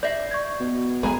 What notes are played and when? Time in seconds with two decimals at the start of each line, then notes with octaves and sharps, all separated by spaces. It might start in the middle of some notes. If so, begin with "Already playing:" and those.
0.03 D5 E5 G6 A#6 C7
0.31 C#6 G6 G#6
0.60 B2
1.03 D#1 G#3 B3 G#4 A4 G#5 A#5 B5